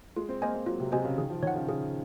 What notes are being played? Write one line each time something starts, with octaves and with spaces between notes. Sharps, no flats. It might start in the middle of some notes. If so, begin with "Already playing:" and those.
G#3 F4
C4
A#3 C5 D#5 G#5
A#3
F#3 F4
C3
C3 C5 D#5 G#5
C#3
D#3 G#4
F3
D#3 C#5 F#5
C#3
C#3 G#4